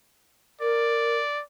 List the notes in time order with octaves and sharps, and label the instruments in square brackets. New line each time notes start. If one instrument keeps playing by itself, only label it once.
[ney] A#4 [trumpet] D5